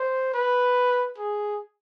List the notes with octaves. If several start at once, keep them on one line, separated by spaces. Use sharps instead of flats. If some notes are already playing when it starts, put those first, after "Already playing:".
Already playing: C5
B4
G#4